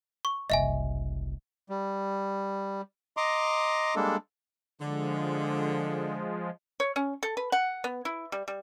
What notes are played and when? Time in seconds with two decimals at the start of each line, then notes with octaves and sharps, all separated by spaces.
0.25 C#6
0.50 F#1 C2 D#5 E5 G#5
1.69 G3
3.17 D#5 A#5 C6 D6
3.96 G3 G#3 A#3 D4 A4
4.81 D3 F3 G#3
6.80 C#5
6.96 C#4
7.23 A4
7.37 B4
7.52 F#5
7.84 B3
8.05 E4
8.32 G3
8.48 G3